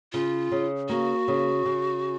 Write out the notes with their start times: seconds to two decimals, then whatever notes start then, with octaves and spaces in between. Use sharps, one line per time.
0.13 C#3 F4
0.52 C#3
0.89 A#3 F#4
1.28 C#3
1.66 C#3